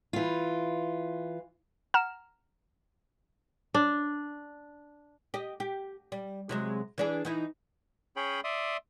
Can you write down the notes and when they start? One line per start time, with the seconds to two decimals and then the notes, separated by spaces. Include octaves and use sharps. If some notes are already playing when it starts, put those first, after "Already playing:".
0.13 E3 F4
1.94 F#5 A#5 F6 E7
3.74 D4
5.34 G4 D#5
5.60 G4
6.12 G3
6.49 C3 F#3 G#3
6.98 E3 D4 G#4
7.25 E3 D#4 E4
8.16 C#4 G#4 C#5 G5 B5
8.44 D5 E5 C6 D#6